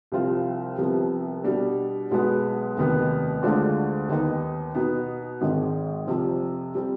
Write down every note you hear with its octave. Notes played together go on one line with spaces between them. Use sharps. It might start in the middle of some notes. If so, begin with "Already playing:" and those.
C2 C3 F3 C4 F4
C2 C3 F3 B3
B2 G3 D4
B1 B2 G#3 B3
F1 D#2 D#3 B3
D2 D3 G#3 D4 F4
D#2 D#3 B3 D#4
B2 B3 D#4
G#1 G#2 D#3 G#3
F2 C3 F3
G3 C4